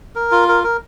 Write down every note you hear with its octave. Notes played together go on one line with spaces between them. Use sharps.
A#4
F4
A#4
A#4